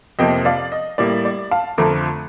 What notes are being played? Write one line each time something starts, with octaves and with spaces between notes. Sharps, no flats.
F2 C3 F3 A#3 D#5 G5
D5 F5
D#5
A2 G3 A#3 D5
D5
F5 A5
F2 D3 F3 A3 A#5 D6